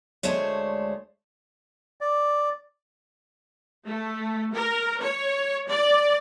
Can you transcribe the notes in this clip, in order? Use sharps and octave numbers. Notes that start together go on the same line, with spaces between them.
D2 G#3 A3 D4 C5 C#5
D5
A3
A#4
C#5
D5